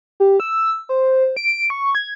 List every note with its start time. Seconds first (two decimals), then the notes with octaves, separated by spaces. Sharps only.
0.20 G4
0.40 E6
0.89 C5
1.37 D7
1.70 C#6
1.95 G#6